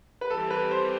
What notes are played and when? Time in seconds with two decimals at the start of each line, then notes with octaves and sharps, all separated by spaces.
0.21 B4
0.30 E3 G3 C4 G4 A4
0.50 B4
0.71 C5